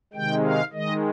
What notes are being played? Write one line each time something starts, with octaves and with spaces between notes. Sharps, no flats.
C3 D#3 G#3 G5
F5
D#3 G#3 D#5